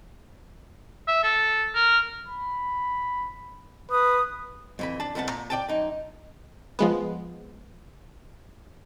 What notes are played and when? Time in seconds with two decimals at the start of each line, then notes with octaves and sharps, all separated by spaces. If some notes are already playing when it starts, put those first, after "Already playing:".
1.08 E5
1.23 A4
1.75 A#4
2.28 B5
3.91 B4 D#6
4.79 F2 E3 B5
5.00 D4 A5
5.15 C2 F2 B3 F#5 A5
5.28 A#2 A#5
5.50 D5 G5 A5
5.68 F#2 D#4
6.79 F3 G#3 B3